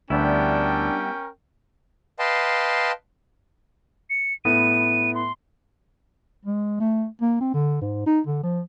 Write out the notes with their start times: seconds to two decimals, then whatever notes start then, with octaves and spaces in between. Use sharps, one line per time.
0.10 D2 G3 B3 C#4 D4 E4 A#4 G5
2.19 B4 D#5 F5 G5 A5 C6
4.10 C#7
4.45 A2 B3 D#7
5.15 C6
6.45 G#3
6.80 A3
7.21 A#3
7.41 C4
7.54 D3
7.81 G#2
8.06 D#4
8.27 D3
8.43 F3